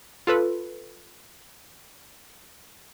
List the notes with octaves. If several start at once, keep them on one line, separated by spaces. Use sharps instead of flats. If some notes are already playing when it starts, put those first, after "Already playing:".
F4 A4 B4